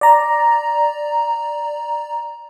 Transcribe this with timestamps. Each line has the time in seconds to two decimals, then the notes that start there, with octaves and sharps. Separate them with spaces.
0.01 D5 A#5